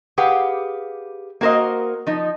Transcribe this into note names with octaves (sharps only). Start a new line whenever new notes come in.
G4 G#4 B4 F5 F#5
A#3 F#4 A#4 C5 D#5
F3 D#4